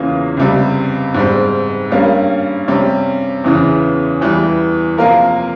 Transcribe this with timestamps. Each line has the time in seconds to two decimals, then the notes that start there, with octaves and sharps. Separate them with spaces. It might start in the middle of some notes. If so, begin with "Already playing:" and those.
Already playing: E2 C#3 E3 A#3 F4
0.37 C#2 C3 G3
1.14 G#2 G3 C4
1.90 G2 G3 A#3 C#4
2.68 C3 G3 C#4
3.44 E2 C#3 E3
4.21 E2 E3 G3
4.98 C3 F3 A#3 F4 A#4